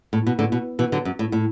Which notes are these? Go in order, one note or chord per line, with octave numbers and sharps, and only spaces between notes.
A2
B2
A2 D3
B2
B2 E3
D3 F#3
F#2
A2
A2